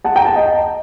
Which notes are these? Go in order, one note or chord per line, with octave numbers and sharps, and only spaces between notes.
F#5 A5
G5 A#5
F#5 A5
D#5 G5